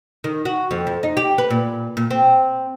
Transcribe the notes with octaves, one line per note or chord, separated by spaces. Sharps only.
D#3
F#4
F2
F2
D#4
G4
B4
A#2
A#2
C4